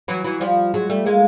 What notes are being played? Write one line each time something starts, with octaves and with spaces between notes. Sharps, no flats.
E3 F#3
E3 F#3
F3 G3
F#3 G#3
G3 A3
G#3 A#3